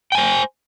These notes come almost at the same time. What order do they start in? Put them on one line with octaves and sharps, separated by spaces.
G5 G#5 C5